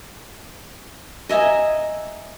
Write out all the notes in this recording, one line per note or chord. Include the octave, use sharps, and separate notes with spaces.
D#5 E5 G#5 A#5